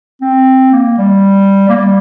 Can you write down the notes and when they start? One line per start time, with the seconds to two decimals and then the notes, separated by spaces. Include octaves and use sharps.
0.21 C4
0.72 A#3
0.98 G3
1.69 A#3
1.75 G3